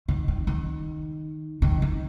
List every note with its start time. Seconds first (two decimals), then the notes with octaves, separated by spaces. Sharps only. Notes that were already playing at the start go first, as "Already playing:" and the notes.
0.08 D#3
0.28 D#3
0.47 D#3
1.62 D#3
1.82 D#3